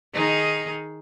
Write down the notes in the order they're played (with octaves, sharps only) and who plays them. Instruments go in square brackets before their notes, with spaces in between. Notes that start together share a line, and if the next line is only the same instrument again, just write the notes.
[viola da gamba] D#3 D#4 G#4